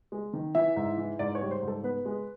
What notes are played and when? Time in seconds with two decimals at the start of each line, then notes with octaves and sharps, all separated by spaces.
0.12 G#3
0.33 D#3
0.55 E3 E5
0.76 G#2
0.97 E3
1.19 G#2 D5
1.35 C#5
1.41 G3
1.51 C5
1.62 G#2
1.68 A4
1.84 B3 B4
2.05 G#3